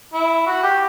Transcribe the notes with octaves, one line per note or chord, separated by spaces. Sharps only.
E4
F#4
G4